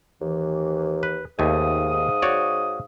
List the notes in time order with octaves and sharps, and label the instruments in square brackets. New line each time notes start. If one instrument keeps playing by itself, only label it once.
[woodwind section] D#2 E3
[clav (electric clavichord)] B4
[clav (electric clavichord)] D#2 A3 G#5 [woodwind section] G#2 F5 D#6
[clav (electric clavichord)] F#4 C#5 D5